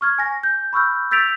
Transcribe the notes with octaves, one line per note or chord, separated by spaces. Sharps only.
C#6 F6 G#6
G#5 A#6
G6
B5 C#6 E6 F6 G6
E6 G6 A6 B6 D7 F7